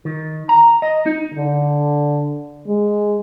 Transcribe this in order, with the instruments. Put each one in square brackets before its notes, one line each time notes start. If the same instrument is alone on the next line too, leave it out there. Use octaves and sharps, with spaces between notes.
[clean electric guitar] D#3
A#5
D#5
D#4
[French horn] D3
G#3